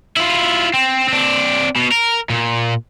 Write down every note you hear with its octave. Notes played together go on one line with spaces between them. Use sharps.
E4 F4
C4
C4 D4
B2
A#4
A#2